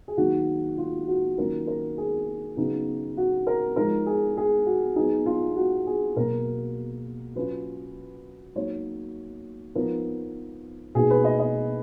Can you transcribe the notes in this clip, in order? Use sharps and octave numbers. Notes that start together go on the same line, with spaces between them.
G#4
D#3 F#3 A#3 D#4 F#4
F4
F#4
D#3 F#3 A#3 C#4 F4 A#4
A#4
G#4
C#3 F#3 B3 D#4
F#4
A#4
F3 G#3 D#4 A#4
G#4
G#4
F#4
F#3 B3 D#4 G#4
F4
F#4
G#4
B2 F#3 A#3 A#4
F#3 C#4 F4 B4
F#3 A#3 D#4 C#5
F3 B3 D#4 A#4
B2 A#3 D#4 G#4
B4
D#5
D#5